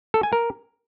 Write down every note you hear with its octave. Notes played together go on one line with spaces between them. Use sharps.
A4
G#5
A#4